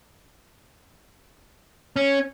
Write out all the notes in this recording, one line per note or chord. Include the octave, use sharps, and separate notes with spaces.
C#4